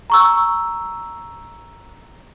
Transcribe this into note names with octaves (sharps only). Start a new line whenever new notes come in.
A#5 C#6 E6